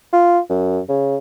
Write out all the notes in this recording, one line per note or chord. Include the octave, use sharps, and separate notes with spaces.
F4
F#2
C#3